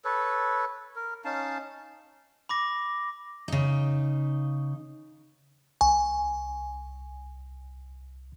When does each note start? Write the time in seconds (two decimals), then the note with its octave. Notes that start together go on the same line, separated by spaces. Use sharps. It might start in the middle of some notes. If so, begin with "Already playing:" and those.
0.05 A4 B4 C#5
0.96 A#4
1.25 C#4 D#4 F5 A5
2.49 B5 D6 A#6
3.48 C#3 D#4
5.81 C2 G#5 C#6